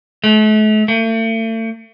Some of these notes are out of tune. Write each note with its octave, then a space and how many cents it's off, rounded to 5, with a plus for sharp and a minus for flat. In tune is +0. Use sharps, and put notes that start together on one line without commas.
A3 -40
A3 +40